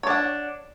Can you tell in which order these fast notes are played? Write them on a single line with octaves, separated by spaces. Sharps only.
C#5 D4 F#5